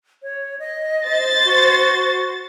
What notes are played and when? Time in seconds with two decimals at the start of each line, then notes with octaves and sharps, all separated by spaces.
0.23 C#5
0.59 D#5
1.09 C5 A6
1.45 F#4